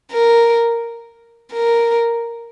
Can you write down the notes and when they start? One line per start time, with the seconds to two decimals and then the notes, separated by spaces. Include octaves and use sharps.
0.12 A#4
1.53 A#4